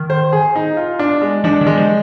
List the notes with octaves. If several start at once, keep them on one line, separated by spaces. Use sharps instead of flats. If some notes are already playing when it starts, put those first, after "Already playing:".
Already playing: D#3
C5
G#4
D#4
F4
D4
G#3
F3 D4
D#3
G#3
F3